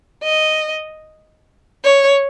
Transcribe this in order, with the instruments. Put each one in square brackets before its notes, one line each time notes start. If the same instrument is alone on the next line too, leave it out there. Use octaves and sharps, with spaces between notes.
[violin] D#5
C#5